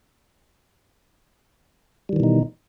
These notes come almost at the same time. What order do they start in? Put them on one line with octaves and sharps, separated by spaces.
G3 D#3 E3 B2 D#4